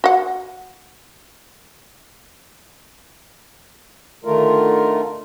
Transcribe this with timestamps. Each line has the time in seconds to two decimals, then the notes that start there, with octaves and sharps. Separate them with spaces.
0.04 F#4 F#5
4.24 D3 D#3 A3 F4 A#4